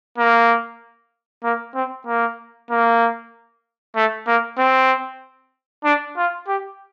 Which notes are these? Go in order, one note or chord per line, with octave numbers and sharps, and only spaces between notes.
A#3
A#3
C4
A#3
A#3
A3
A#3
C4
D4
F4
G4